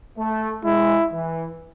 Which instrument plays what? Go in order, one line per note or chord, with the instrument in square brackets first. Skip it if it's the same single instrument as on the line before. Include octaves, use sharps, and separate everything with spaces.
[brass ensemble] A3
[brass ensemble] G#3 [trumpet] E4
[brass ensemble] E3